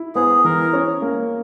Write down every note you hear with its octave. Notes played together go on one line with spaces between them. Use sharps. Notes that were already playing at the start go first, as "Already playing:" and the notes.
Already playing: E4
B3 G#4
E3 A#4
C#4
A#3